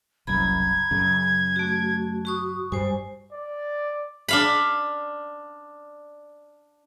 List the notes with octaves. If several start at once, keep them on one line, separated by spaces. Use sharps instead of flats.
F#1 C2 F#2 A#5 B5 G#6
F#2 C#3
A3 F#4
F#4 C#6 D#6
G2 G3 C5 G#5
D5
D4 F5 B5